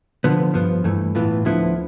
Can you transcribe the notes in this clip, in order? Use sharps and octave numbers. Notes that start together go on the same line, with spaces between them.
D3 F3 B3
G2 F3 B3
G2 E3 A3
A2 E3 B3 F4
D2 D3 F3 B3 E4